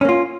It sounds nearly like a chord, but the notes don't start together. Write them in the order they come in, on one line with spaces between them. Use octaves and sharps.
C#4 A#3 F4